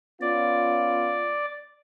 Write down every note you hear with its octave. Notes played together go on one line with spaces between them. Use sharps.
B3 C#4 F4 D5